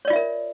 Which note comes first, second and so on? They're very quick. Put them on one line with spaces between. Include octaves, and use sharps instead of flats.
C#5 D5 F4 E5 A#4